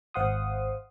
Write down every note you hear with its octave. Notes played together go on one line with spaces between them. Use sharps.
G#1 C5 F5 F#5 C6 D#6